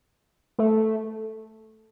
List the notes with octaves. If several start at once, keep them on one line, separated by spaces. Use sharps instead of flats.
A3